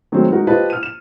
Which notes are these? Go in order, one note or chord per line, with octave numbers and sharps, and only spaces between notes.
D#3 F#3 G#3 A3 C4 C5
G#3 D#4 F#4 A#4 F#5
F4 G4 B4 C5 D#5 A5
F6 D#7
E7